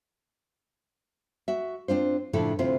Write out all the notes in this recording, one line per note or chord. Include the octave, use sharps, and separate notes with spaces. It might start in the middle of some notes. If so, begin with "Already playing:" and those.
F#4 E5
C4 D4 F4 C5
A2 C#3 F3 D4 E4 A4
D2 C3 C4 E4 F4 C5